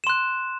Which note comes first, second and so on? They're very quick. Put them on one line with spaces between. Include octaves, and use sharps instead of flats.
E7 C6 F#6